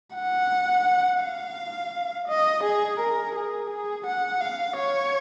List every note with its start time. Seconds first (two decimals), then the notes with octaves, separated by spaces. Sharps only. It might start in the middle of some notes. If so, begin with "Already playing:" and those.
0.15 F#5
1.22 F5
2.28 D#5
2.64 G#4
3.00 A#4
3.35 G#4
3.70 G#4
4.07 F#5
4.41 F5
4.77 C#5